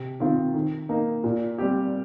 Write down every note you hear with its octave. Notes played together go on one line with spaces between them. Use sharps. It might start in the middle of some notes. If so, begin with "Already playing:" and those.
Already playing: C3
D#3 C4 F4
D#3
A#3 D#4
A#2
G3 C4 G4